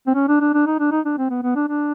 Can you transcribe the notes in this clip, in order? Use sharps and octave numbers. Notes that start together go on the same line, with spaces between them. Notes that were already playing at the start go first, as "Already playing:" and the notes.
C4
C#4
D4
D4
D4
D#4
D4
D#4
D4
C4
B3
B3
D4
D4